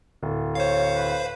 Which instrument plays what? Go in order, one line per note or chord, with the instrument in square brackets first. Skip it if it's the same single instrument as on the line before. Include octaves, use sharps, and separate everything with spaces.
[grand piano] D1
[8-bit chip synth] C5 F5 [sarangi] C#5
[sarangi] B4